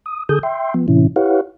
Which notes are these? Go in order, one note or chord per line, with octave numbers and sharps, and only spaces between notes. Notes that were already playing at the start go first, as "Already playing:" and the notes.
D#6
D3 G#4 A4 D#6 G6
E5 G5 C6
F3 B3
A2 C3 E3 C#4 E4
E4 G4 B4 C#5 F5 F#5